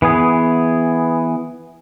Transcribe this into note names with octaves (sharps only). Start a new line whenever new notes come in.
E3 B3 G#4